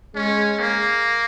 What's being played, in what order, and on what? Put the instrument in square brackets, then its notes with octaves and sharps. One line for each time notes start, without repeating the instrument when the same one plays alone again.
[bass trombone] G#3 [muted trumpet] C#4
[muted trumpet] A#3